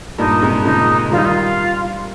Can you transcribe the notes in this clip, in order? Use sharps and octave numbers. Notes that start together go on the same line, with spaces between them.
G2 A#2 D#4
G#2 C3
A#2 C#3 D#4
D#3 G3 F4
D#4
F4